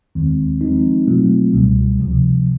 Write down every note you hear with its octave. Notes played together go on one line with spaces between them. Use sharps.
D#2 D#3 G#3 C4
F3 G#3 C4 D#4
B2 F#3 A3 C4 F4
C#2 B2 G3
D2 C3 F3